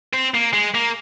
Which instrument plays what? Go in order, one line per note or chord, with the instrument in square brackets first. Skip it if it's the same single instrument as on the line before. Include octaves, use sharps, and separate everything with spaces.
[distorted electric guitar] C4
A#3
G#3
A#3